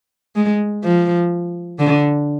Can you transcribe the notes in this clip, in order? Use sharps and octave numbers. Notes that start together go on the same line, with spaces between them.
G#3
F3
D3